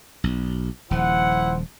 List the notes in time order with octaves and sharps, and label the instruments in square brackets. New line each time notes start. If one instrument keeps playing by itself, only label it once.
[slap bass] B1
[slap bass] D#1 F3 [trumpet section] E4 C5 F#5